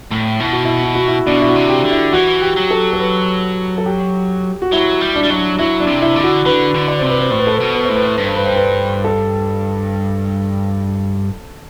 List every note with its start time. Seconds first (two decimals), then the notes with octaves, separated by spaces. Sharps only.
0.11 A2
0.40 B2 E4
0.53 F#4
0.65 E4
0.83 E4
0.95 F#4
1.08 E4
1.27 B2 D4
1.41 E4
1.48 F#4
1.56 C3
1.69 G4
1.84 D3
1.91 E4
2.12 E3 F#4
2.41 G4
2.57 F#3
2.71 A4
2.93 A4
3.00 B4
3.78 A4
3.86 G4
4.62 F#4
4.72 F#3 E4
5.01 G3
5.16 D4
5.23 G3
5.30 F#3 D4
5.59 F#3 E4
5.80 D4
5.87 C3
6.02 E4
6.16 D3 E4
6.24 F#4
6.45 D3 B4
6.74 D3
6.88 D5
6.99 C3 C5
7.09 B4
7.20 C5
7.31 A2 C5
7.39 B4
7.47 A4
7.55 B4
7.60 B2
7.75 B4
7.85 A2 C5
7.96 B4
8.05 C5
8.15 G2 B4
8.25 C5
8.36 B4
8.46 C5
8.56 B4
9.05 A4